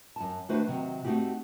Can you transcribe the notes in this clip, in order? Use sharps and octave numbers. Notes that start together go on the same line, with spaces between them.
F#2 A5
D#3 A3 D4 F#4 B4 C5
C3 D#3 F#3
A3 C4 D4 D#4 F#4 G4